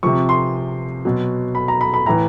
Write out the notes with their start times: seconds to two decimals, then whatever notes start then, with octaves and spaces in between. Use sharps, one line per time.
0.03 C3 F3 C#6
0.29 C6
1.05 B2 F#3
1.55 B5
1.68 A#5
1.81 B5
1.94 B5
2.06 A2 E3 A#5